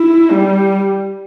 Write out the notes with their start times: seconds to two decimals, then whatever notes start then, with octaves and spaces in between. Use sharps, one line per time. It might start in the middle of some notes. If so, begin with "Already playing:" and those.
Already playing: E4
0.31 G3